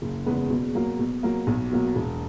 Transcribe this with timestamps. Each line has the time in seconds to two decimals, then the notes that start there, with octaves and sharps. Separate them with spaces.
0.02 F#1
0.26 E2 C#3 G#3 B3
0.50 B2
0.75 F#3 A#3
0.99 B2
1.23 F#3 A#3
1.47 B1
1.71 B2 F#3 A#3
1.96 E1